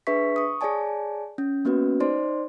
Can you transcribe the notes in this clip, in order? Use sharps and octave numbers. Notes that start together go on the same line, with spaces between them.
D4 G#4 B4 E5 C#6 B6
C#6 D#6
G#4 C#5 D5 G#5 A5
C#4
A#3 B3 C#4 F#4 B4
D#4 C5 D5 C6